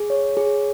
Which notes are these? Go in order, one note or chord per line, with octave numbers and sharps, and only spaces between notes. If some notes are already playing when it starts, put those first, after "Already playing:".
Already playing: G#4
C#5
G#4